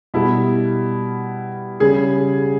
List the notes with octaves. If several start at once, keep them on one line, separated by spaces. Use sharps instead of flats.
B2 G3 E4
C#3 G3 G#4